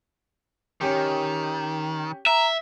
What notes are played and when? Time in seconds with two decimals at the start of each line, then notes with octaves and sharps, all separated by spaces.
0.81 D#3 C#4 G4
2.26 E5 A#5